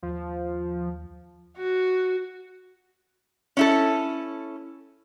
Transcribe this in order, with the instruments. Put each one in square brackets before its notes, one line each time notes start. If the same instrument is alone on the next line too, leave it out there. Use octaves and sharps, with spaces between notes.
[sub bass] D#2 [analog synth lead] F3
[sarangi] F#4
[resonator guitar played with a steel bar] C#4 E4 A4